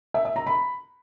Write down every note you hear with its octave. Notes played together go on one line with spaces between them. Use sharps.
E5
E5
A#5
B5